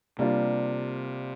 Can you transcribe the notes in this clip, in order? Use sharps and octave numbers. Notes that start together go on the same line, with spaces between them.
C3 G3 A#3 D4 F4